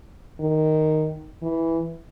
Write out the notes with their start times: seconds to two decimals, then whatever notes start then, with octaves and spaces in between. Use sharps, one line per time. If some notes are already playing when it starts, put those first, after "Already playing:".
0.40 D#3
1.43 E3